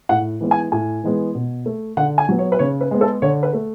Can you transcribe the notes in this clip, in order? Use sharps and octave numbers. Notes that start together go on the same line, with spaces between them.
A2 F#5
E3 G#3 B3
G#5
A2 G#5
E3 G#3 B3
B2
A3
D3 F#5
G#5
F#3 B3
C#5
B4
C#3 C#5
B4
G#3 B3
A4
D3 C#5
B4
A3